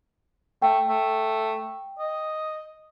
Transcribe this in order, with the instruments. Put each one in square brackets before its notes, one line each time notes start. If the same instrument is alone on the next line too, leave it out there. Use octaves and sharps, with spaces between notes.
[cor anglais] A3 [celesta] G5
[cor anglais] A3
D#5